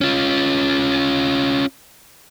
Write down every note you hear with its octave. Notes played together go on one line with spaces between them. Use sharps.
C#4 F4